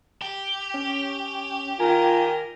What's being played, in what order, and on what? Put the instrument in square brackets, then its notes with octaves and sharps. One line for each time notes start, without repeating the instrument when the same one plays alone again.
[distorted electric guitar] G4
[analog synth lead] C#4
[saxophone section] D#3 A#4 [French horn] F4 [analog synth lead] G#5